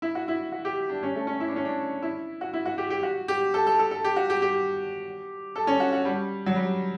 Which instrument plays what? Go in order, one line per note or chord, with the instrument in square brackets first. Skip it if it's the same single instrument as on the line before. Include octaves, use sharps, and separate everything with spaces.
[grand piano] E4
F#4
E4
F#4
G4
D4
C#4
A3
C#4
E4
D4
C#4
D4
E4
F#4
E4
F#4
G4
G4
F#4
G4
A4
A4
A4
A4
G4
F#4
G4
G4
A4
C#4
F#4
F#4
G3
F#3
G3